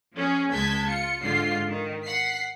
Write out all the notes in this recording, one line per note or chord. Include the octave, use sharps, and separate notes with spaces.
F3 C#4 G#4
C#2 G#3 A5 G6 G#6 B6
F4 C#7
G#2 D3 F4 C7
D#3
F#5 B6 C7